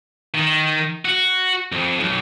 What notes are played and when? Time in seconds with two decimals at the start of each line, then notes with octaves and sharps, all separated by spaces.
0.35 D#3
1.05 F#4
1.72 F2
2.00 B1